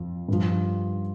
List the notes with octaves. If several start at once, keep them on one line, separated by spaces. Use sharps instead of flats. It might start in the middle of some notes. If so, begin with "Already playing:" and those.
Already playing: F2 F3
G2 F3